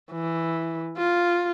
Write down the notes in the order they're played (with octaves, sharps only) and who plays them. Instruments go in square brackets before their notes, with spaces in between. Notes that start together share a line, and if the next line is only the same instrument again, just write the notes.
[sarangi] E3
F4